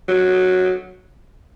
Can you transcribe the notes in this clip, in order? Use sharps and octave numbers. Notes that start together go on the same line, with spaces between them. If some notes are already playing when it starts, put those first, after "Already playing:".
F#3